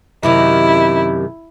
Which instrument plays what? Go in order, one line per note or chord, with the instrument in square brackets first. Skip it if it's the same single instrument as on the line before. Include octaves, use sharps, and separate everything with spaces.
[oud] F#2 C3 D#3 [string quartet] E4